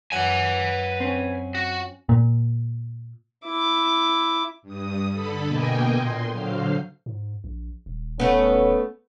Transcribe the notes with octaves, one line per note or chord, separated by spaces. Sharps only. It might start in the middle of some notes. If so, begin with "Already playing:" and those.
F#2 F#3 B4 F#5 G#5
C4 C#4
F#4
A#2
E4 D6
G2 D#6
D3 A4 B5
B2 A#3 D#5 G5 G#5
A#2 C6
D3 F#3 C5 F5 C7
G#2
A#1
D#1
A3 B3 C#4